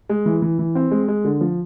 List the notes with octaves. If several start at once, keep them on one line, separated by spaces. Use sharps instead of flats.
G#3
E3
E3
E3
C4
G#3
G#3
D3
F3